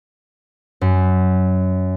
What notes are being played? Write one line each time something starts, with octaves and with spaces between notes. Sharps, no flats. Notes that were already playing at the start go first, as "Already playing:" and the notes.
F#2